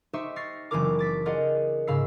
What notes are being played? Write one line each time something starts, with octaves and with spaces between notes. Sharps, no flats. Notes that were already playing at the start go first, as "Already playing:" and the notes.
D#4 G4 C5 E5 C#6
C#6 F6 A6 A#6 C7
F#1 E3 C4 E4 A#4 D6
D6 A6 B6
F4 G#4 A#4 D5 D#5 F#5
G#2 C#3 F5 B5 E6 C7